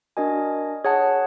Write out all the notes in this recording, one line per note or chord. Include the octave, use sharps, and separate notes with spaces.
D4 F#4 A#4 D#5 G#5
G#4 C#5 F#5 A5